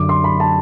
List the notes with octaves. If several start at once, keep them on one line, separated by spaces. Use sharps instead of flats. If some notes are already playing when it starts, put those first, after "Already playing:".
Already playing: F#2 D3 D6
C6
B5
A5